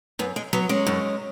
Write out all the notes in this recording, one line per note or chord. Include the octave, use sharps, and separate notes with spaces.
F#2 B3
G#3
F#3 B3
G#3 C#4
F#2